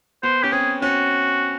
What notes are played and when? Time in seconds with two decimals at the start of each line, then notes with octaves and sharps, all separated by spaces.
0.23 B3 C5
0.43 C#4 G4
0.52 C4 G#4
0.82 C#4 F#4